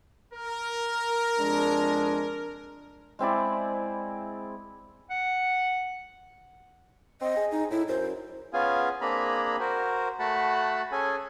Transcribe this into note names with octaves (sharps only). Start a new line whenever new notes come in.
A#4
F2 G#3 D4
G#3 C4 E4 D5
F#5
C4 D#5
G#4
D#4
A2 E4
F#2 C5
B3 C#4 F4 G#4 F5 G#5
A#3 C4 D4 G#4 A#5 B5
F#4 A#4 C5
A3 F#4 F#5 A5 B5
C#4 G#4 A4 G#5